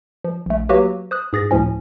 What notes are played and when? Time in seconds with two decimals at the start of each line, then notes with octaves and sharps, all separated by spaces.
0.24 F3
0.46 A#1 A3
0.69 F#3 A#3 F#4 G4 B4
1.11 C5 D#6 F#6
1.33 G#2 G#4 A6 A#6
1.51 D2 A2 F3 C#4